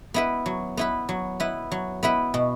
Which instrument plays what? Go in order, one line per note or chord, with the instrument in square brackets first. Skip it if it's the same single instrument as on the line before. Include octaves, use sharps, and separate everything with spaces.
[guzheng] B3 E4 B4
F#3
B3 E4 B4
F#3
B3 E4 B4
F#3
B3 E4 B4
B2